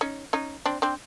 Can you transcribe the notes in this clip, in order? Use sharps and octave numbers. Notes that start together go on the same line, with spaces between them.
C#4 D#4
C#4 D#4
C4 D4
C4 D4